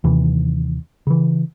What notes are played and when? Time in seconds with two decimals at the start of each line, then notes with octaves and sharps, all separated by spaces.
0.04 D#2 C3 E3
1.07 C#3 E3